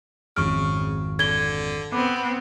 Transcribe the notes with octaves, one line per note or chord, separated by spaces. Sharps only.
G#1 F2 C#3 C#6 F6 D7
D3 G#6 G7
B3 C4 C5 D6